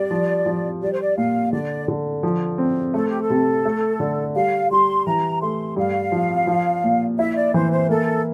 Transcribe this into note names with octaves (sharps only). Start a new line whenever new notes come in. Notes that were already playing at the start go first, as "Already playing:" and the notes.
Already playing: G3 D5
F3
F3
G3 D5
C5
D5
A#2 F5
D3 D5
D3
F3
C4
A3 A4
G4
A4
C3
A3
D3
G3 F5
G3 C6
E3 A#5
A3 C6
G2 F5
F3
F3
A#2
E4 E5
D5
E3 C5
C5
A#3 A4